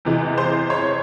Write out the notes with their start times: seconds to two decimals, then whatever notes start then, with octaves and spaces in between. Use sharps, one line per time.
0.05 E2 C3 E3 G#3
0.38 C5
0.70 C#5